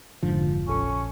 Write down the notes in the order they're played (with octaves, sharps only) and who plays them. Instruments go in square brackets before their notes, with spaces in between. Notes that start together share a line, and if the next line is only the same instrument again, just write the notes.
[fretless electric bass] F1 F3 [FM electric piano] G#2 D3
[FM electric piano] A#1 A4 C#6 [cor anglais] C#4